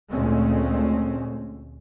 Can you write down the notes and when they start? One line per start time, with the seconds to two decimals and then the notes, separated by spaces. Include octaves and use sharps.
0.10 D2 A#2 G#3 A3 C4 C#4